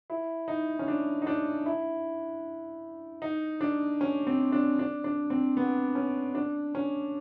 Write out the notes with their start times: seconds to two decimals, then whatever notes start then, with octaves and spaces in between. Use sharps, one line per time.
0.10 E4
0.48 D#4
0.79 C#4
0.88 D4
1.22 D#4
1.27 D4
1.66 E4
3.22 D#4
3.61 D4
4.01 C#4
4.27 C4
4.52 D4
4.79 D4
5.04 D4
5.30 C4
5.57 B3
5.95 C#4
6.35 D4
6.75 C#4